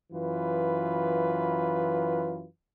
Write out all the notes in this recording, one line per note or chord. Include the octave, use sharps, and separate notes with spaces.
F#2 E3 F4 B4